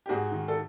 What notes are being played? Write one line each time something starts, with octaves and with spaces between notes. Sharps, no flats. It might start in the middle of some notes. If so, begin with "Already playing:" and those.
G4
G#2 F#4 G#4
D#3
A4